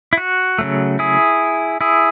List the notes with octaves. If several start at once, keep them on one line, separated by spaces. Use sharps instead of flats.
E4
F#4
C#3 F#3 A3
E4 G#4
E4 G#4